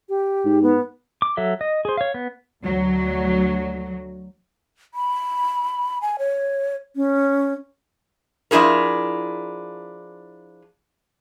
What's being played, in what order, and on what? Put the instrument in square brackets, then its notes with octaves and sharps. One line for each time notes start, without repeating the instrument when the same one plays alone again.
[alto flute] G4
[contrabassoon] G#2
[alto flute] B3
[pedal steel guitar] D6
F#3 A4 E5
D#5
G#4 C5
C#5 F5
B3
[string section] D2 F#3
[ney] B5
G#5
C#5
[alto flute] C#4
[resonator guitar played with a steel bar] F3 D4 E4 G#4 A#4